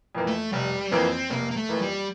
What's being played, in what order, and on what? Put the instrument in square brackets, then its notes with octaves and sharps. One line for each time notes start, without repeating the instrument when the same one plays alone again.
[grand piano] F2 E3 A#3
[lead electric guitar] A3
[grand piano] F1 [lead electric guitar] G3
[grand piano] F2 E3 A#3 [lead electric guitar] C4
[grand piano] F1 [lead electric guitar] A#3
[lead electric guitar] A#3
A3
[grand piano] F2 E3 A#3
[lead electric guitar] G3